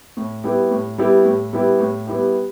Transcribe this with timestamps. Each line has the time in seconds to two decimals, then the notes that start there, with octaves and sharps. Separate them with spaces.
0.17 A2
0.44 G3 B3 E4 G4
0.71 A2
0.98 G3 B3 E4 G4
1.25 A2
1.53 G3 B3 E4 G4
1.80 A2
2.07 G3 B3 E4 G4